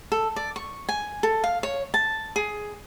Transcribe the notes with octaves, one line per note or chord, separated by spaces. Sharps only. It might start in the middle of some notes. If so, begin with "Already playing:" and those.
A4
D5
C#6
G#5
A4
F5
C#5
A5
G#4